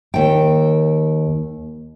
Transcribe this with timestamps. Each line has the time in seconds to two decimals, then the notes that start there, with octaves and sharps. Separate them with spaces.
0.14 D#2 G5